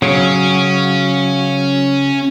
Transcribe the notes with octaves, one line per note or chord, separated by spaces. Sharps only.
C#3 F#3 C#4